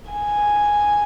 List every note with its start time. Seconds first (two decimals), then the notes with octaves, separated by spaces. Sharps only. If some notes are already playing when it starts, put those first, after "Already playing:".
0.11 G#5